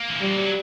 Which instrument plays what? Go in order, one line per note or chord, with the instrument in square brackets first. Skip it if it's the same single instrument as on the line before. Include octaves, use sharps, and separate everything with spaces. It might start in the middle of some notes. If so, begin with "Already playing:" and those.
Already playing: [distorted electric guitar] A#3
E3
[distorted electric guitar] F3 [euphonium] G3
[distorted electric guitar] F#3